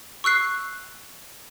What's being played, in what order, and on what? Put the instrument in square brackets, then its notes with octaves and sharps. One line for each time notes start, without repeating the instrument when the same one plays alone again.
[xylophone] C#6 E6 F#6 C7